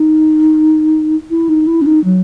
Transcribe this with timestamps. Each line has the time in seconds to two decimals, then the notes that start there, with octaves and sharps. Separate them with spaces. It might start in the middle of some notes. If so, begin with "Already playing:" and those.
Already playing: D#4
1.30 E4
1.49 D#4
1.67 E4
1.82 C#4
1.86 D#4
2.04 F#3